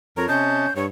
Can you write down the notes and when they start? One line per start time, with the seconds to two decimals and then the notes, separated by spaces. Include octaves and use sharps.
0.17 F2 A#4 C#5 A#5
0.29 C3 C#4 D#5 A5 G6
0.76 G2 C#5